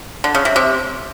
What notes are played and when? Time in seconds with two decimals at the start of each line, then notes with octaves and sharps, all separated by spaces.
0.24 D3
0.35 C#3
0.45 C3
0.56 C3